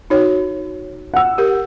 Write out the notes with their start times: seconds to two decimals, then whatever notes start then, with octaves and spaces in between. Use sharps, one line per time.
0.10 D#4 F#4 C#5
1.14 F#5 E6
1.38 G4 A#4